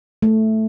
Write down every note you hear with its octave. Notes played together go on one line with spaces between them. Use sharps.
A3